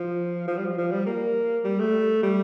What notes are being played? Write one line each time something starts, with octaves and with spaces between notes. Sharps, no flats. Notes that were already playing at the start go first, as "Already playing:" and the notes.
Already playing: F3
F3
G3
F3
F3
G3
A#3
G3
A3
G3